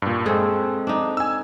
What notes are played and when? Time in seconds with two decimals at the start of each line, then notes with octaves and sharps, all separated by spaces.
0.02 G2 A#2
0.26 G#3 C4 G#4 A4
0.87 D4 D#4
1.17 G#5 E6